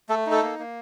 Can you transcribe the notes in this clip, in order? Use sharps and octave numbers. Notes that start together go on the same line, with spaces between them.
A3 A4
D#4
A4
A#3
A#3